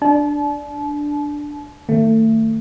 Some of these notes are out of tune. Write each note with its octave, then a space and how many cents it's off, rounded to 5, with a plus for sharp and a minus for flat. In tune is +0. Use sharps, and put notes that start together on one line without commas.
D4 +0 A5 -35
D#3 +0 A3 +25